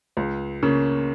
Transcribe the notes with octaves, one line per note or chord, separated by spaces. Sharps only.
C#2
C#3 A#3 C#4